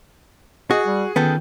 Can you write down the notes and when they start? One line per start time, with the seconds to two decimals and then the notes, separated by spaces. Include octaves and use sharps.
0.71 F#4 G#4 D#5
0.86 G3
1.16 D#3 B3 C#4 F4 A4 G5